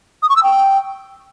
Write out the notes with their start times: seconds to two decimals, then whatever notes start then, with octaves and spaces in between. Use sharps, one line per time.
0.23 D#6
0.30 C#6
0.36 E6
0.43 G5